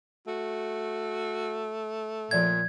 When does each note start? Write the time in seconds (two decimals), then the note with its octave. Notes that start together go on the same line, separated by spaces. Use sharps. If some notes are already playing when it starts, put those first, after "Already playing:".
0.27 A3 F#4
2.31 A#2 F3 D5 E5 G#6